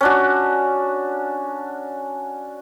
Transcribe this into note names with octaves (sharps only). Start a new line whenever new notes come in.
C#4 D4 F#4